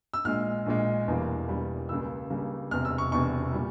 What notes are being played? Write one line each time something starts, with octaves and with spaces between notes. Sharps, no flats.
E6
A#1 A#2 G#3 F6
A#1 A#2 G#3
E1 E2 E3 G3 A#3
E1 E2 E3 G3 A#3
C#2 C#3 G3 A#3 E6
C#2 C#3 G3 A#3
E1 E2 C3 F6
E6
C#6
E1 E2 C3 C#6
A#2 G3